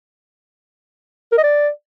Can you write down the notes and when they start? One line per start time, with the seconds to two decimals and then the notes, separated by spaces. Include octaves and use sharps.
1.32 A#4
1.38 D#5
1.43 D5